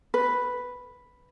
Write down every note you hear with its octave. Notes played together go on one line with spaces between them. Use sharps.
B4